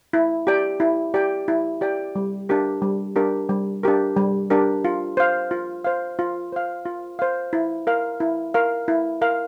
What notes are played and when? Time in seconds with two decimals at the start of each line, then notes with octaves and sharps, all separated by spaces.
0.13 E4
0.47 G4 D5 G5
0.80 E4
1.14 G4 D5 G5
1.48 E4
1.81 G4 D5 G5
2.15 G3
2.49 D4 G4 A#4
2.82 G3
3.16 D4 G4 A#4
3.49 G3
3.83 D4 G4 A#4
4.17 G3
4.50 D4 G4 A#4
4.85 F4
5.17 C5 F5
5.51 F4
5.84 C5 F5
6.19 F4
6.52 C5 F5
6.86 F4
7.19 C5 F5
7.53 E4
7.87 A#4 F5
8.20 E4
8.54 A#4 F5
8.88 E4
9.22 A#4 F5